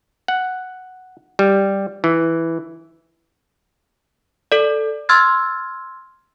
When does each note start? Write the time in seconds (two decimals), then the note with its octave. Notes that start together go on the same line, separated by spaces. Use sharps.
0.28 F#5
1.39 G3
2.04 E3
4.52 A4 D5
5.09 C6 E6 F6 G#6 A6